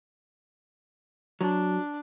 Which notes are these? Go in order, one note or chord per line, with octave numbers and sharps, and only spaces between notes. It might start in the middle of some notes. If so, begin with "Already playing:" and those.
F#3 D4